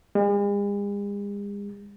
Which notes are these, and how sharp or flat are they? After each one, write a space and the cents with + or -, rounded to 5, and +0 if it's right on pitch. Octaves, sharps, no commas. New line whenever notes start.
G#3 -45